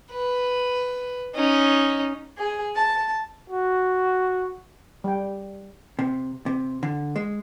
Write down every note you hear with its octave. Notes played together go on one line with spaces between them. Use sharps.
B4
C#4 D#4
G#4
A5
F#4
G3 G5
C3
C3
D3
G#3